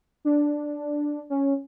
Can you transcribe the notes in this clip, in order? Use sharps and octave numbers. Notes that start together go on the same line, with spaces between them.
D4
C#4